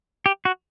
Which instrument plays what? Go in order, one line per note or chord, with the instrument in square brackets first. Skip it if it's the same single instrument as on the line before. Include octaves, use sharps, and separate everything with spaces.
[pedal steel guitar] G4
F#4